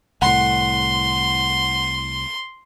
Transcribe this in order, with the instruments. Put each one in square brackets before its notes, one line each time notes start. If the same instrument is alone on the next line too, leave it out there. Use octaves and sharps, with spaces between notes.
[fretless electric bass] C2 A2 [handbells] F#5 [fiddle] C6